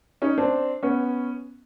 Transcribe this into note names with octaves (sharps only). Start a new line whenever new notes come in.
C#4 D#4
C4 D4
B3 C#4